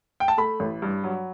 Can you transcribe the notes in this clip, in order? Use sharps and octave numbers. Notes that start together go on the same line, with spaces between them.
G5
A5
A3 B5
A1
G2
F#3